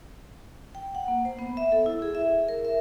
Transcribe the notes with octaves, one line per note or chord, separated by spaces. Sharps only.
G5
F#5
A#3
C5
B3
E5
A4
E4
G#4
E5
A#4
E5